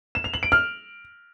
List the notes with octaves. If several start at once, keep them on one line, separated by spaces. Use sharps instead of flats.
E7
F7
F#7
D7
F6